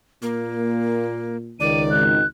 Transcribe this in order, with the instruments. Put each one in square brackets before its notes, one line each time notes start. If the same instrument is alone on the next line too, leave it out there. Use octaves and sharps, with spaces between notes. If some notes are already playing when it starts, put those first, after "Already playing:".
[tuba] A#2 [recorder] A#3
[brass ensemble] C#2 D#3 [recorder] D5 [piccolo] D#7
[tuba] G#1 [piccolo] F#6